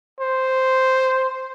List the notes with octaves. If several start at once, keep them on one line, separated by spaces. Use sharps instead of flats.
C5